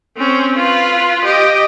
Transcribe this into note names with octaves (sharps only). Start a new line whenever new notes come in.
C4 C#4
F4 B4
G4 D#5